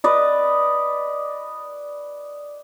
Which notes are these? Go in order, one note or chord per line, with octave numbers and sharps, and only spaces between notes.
B4 D5 D#5